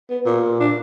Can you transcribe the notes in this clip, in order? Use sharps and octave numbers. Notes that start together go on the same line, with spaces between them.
B3
A#2
D4